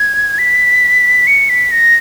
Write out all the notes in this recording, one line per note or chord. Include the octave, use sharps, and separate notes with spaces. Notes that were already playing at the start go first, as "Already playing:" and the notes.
Already playing: G#6
B6
C#7
B6
A#6